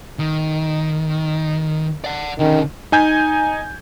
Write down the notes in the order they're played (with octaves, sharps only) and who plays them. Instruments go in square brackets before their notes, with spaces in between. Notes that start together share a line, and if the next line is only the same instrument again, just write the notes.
[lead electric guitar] D#3
D5 F#5
[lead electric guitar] D3 C#4 [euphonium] D#3
[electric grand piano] D#4 G#5 G6 G#6